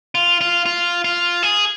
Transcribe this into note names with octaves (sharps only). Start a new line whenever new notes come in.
F4
F4
F4
F4
G#4